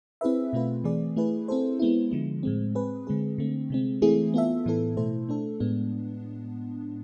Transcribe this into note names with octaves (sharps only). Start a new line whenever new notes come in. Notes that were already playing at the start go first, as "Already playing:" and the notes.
C4 E4 G#4 B4 E5
B2 A3 C4 F4 B4
E3 A3 C4 G#4 D5
A3 E4 G#4 B4
C4 E4 A4 C5
G#3 B3 E4
D3 F3 G#3
A2 G#3 C4
C4 G#4 B4
D3 G#3 C4 G#4
D3 A3 C4
C3 G#3 C4
E3 A3 C4 E4 G#4
B3 F4 A4 E5
A2 E3 B3 E4 A4
B2 A3 E4 A4 C5
A3 D4 A4
A2 G#3 B3 D4